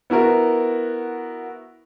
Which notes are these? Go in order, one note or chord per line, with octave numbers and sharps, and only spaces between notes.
B3 E4 F#4 A#4